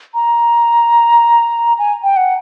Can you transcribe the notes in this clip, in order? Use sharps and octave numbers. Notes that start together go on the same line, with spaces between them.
A#5
G#5
G5
F#5